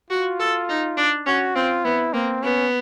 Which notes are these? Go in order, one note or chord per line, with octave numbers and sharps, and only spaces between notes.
F4 F#4
A4
D#4
D4
C#4 F#4
C4 F4
B3 E4
A#3 C4
B3 C#4